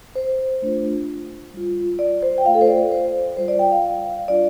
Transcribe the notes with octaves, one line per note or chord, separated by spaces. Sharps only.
C5
A3 D4 F4
G3 F4
D5
C5
G5
A3 F4 F5
A4
C5
D5
C5
G3 F4 C5
D5
G5
F5
G3 D4 F4 D5